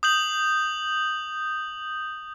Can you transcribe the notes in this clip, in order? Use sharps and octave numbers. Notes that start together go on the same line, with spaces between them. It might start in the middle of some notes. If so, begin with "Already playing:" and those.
D#6 G6 F#7